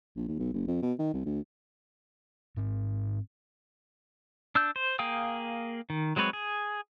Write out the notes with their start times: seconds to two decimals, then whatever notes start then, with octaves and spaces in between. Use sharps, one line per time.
0.16 A#1
0.28 D#2
0.39 B1
0.53 F#1
0.67 F2
0.83 B2
0.99 D#3
1.13 C2
1.26 D2
2.57 G#2 C4
4.55 D4 E6 G6
4.76 C5
4.99 A#3 G#4 F5 G5 D#6
5.90 D#3
6.16 F#3 G#3 C4 B4 C#5
6.33 G#4